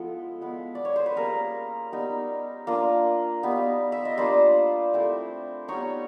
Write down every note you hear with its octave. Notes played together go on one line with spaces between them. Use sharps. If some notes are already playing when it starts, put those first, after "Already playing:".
Already playing: F3 G#3 B3 E4 A4
G#3 B3 E4
D5
C#5
C5
B4
G3 A#3 C#4 G#4 A#4
G3 B3 D#4
A#3 D4 F4
G3 B3 D#4
E5
D#5
G3 A#3 D4 F4 C5 D5
A3 C4 E4
G3 B3 D#4 C#5 D#5